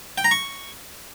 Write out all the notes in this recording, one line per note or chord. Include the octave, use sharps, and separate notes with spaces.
G5
A#5
C#6